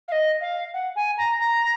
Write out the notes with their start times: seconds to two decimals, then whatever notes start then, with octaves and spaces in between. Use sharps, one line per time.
0.08 F5
0.12 D#5
0.41 F5
0.74 F#5
0.96 G#5
1.17 A#5
1.39 A#5